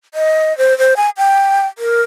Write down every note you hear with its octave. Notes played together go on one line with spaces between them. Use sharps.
D#5
C5
C5
G#5
G5
A#4